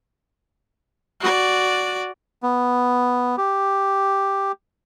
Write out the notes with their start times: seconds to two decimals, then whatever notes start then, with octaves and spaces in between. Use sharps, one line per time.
1.20 F#4 D5
2.43 B3
3.38 G4